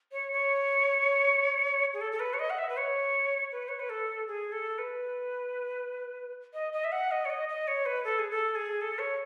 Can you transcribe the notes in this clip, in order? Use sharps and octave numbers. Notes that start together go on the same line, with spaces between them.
C#5
C#5
G#4
A4
A4
B4
C#5
D#5
F#5
E5
B4
C#5
B4
C#5
B4
A4
G#4
A4
B4
D#5
D#5
E5
F#5
D#5
C#5
D#5
D#5
C#5
B4
A4
G#4
A4
G#4
A4
C#5